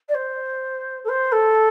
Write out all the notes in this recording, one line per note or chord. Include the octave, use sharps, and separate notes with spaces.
D5
C5
A4
C5
A4